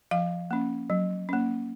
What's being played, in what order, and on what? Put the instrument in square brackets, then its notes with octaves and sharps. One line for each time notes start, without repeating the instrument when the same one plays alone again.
[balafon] F3 F5
A#3 C#4
F#3
A#3 C#4